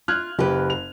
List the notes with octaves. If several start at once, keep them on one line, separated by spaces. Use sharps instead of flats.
F4 F6 F#6 G#6
F#1 G4 B4
F7